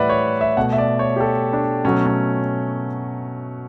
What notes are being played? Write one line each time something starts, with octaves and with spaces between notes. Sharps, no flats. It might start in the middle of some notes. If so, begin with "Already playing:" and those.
Already playing: A2 E3 G3 B4 D5 E5 F#5
C#5
E5
B2 A3 F#5
E5
D5
C#5
G4
A4
D4
B2 F#3 A3 C#4
C#4